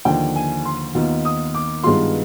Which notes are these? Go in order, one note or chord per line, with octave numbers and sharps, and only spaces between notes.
D#2 D3 F3 G5
G#5
C6
D#2 D#3 B3 F4
D#6
D6
G2 D#3 G#3 B3 F4 C6